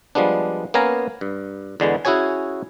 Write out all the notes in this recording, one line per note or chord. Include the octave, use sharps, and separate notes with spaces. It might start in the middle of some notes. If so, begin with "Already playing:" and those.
F3 G3 G#3 B3 D4
A#3 B3 C#4 F5 G#5 A#5
G2
E2 D3 G#3 B3
C#4 E4 F#4 G#4 C#5 G#5